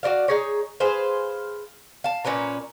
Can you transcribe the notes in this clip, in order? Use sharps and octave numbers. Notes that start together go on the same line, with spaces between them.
F#4 A#4 D5 F5
D#4 G#4 C#5
G#4 B4 C5 F5
F5 A5
A#2 C#4 B4 A#5